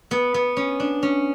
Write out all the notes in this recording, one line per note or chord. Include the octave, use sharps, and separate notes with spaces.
B3
B3
C#4
D4
C#4